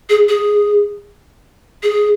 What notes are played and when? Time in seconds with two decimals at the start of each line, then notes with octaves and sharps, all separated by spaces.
0.10 G#4
0.29 G#4
1.83 G#4